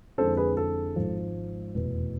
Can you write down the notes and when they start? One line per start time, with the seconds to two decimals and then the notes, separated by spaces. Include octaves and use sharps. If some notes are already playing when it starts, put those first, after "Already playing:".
0.18 F2 D3 G#3 C4 E4 A4 C5
0.37 G#4 B4
0.57 A4
0.96 G#1 G#2 F3
1.74 F1 E2 B2 B3